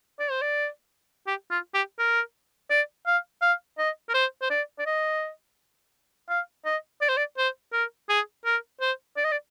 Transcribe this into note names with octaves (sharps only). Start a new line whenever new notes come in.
D5
C5
D5
G4
F4
G4
A#4
D5
F5
F5
D#5
A#4
C5
C5
D5
D5
D#5
F5
D#5
D5
C5
D5
C5
A#4
G#4
A#4
C5
D5
D#5
D5